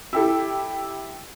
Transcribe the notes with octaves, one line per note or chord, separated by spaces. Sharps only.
E4 G4 A4